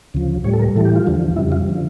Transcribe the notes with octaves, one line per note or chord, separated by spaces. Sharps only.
D2 C#3 F3
A2 G3 C#5
A4
A#4
A2 E3 G3 A4
G4
F4
E2 D3 F3
F2 C#3 G3 E4
F4
D3 F3